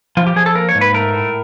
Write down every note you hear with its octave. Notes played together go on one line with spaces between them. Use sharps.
F3 F4
G4
F3 G#4
A4
A#3 A#4
C#5
G#2
B4
A3 A#4
A2